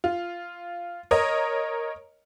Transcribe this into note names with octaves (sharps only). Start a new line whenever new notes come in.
F4
A#4 C#5 D#5